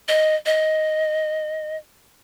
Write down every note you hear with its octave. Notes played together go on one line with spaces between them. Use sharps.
D#5
D#5